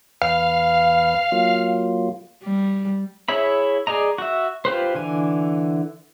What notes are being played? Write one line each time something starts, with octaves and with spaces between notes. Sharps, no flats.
E2 B4 F5
F#3 A#3 F4
G3
E4 G#4 C#5 E5 B5
G#4 D5 D#5 A#5
F#4 E5
F4 G4 B4 C5
D3 E3 G#5